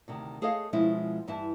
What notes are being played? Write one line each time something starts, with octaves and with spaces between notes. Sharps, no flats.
D2 C3 D#3
A3 G#4 A4 C#5 D#5 F5
B2 F3 G#3 C#4 E4
G2 E3 E4 E5 A5